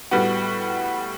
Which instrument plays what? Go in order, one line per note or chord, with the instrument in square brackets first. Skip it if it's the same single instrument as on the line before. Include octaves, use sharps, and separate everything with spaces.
[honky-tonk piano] A2 G3 B3 F#4